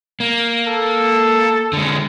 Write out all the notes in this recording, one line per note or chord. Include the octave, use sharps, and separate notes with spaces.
A#3
A4
D3 G#3